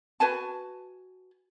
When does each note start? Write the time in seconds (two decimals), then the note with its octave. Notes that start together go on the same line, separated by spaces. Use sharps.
0.20 F#4 B4 G#5 A5